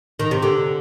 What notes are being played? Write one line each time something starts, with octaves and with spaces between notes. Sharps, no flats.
D#3
C3
D3